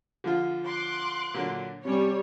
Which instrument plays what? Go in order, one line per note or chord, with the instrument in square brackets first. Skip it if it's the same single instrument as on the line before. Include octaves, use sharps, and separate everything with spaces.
[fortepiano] D3 F3 F4
[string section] C6 D6 F#6
[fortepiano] A#2 D3 F#3
[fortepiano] C3 C#4 [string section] G3 C#5